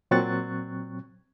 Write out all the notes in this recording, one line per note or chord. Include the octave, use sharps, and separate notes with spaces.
A#2 F#3 C4 C#6 F#6 A6